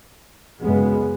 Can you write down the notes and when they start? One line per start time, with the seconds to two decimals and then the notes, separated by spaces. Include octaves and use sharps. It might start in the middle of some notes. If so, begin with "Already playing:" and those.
0.59 F#2 C#3 G#3 B3